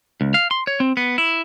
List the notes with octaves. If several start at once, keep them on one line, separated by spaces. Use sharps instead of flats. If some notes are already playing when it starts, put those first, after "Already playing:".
C#2
F5
C6
C#5
C4
B3
E4